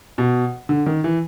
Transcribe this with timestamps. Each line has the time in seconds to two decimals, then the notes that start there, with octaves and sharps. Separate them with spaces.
0.18 B2
0.69 D3
0.86 D#3
1.04 E3